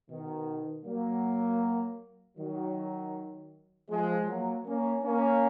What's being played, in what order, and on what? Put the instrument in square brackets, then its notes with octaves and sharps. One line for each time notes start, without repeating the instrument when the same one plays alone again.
[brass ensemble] B2 D#3
F#3 A#3
D#3 F#3
F3 G#3
F#3 A#3
A#3 C#4
A#3 C#4